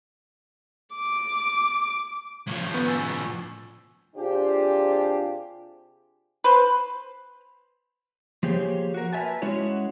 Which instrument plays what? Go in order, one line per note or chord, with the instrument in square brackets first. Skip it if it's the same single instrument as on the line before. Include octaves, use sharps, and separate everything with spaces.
[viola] D6
[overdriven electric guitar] A2 F3
[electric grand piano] B3
G#5 E6 A6
[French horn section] C3 D4 F4 G4 G#4 C5
[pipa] B4 C5
[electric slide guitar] F3 A#3 G4 G#4 C5 C#5
F#4 A#4
A#4 B4 C#5 E5 G#5 A5
G#3 C#4 E4 F#4 C#5